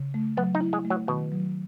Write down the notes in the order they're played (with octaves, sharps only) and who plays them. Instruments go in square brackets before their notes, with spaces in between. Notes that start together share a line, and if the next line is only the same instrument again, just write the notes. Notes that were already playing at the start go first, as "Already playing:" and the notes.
Already playing: [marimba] C#3
A3
[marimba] F#3 [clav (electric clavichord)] B3
[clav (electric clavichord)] D#4
[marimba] E4
[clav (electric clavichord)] G#3
[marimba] A3
[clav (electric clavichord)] F#3
[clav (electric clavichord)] B2 [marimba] D#3
[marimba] F#3